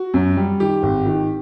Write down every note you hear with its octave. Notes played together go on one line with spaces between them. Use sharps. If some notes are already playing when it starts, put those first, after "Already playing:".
Already playing: F#4
F#2
G3
D#3 G4
G#1
D#3